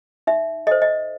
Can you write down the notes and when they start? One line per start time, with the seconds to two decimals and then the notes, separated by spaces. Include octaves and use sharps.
0.27 D#4 E5
0.67 A4 C5 D#5
0.82 D#5